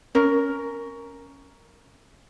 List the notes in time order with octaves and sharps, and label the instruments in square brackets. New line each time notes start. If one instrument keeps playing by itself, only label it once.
[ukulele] C#4 A#4